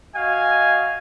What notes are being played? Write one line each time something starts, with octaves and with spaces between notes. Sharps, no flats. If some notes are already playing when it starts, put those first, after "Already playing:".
F#4 D#5 F5 G#5